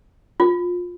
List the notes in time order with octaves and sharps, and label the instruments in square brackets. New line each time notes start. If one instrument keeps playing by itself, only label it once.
[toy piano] F4